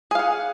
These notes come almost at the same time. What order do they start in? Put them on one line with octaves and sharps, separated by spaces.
G#4 F5 F#5